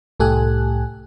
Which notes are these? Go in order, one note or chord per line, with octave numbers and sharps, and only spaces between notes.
C2 A2 G4 A4 G#5 F#6